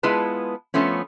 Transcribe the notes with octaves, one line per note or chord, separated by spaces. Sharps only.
G#3 B3 E4 F4 B4 A5
F3 A3 B3 C#4